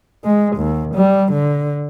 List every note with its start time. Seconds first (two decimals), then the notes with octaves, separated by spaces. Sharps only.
0.24 G#3
0.57 D#2
0.95 G3
1.32 D3